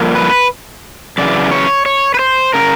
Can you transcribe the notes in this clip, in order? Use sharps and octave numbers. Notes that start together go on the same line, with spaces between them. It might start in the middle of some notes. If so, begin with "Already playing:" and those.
Already playing: G2 D3 F3 A#3
B4
F#2 C#3 E3 D5
C#5
C#5
B4
C5
C#3 A#4